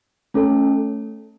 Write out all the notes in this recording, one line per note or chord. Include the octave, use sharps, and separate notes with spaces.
A3 C#4 A4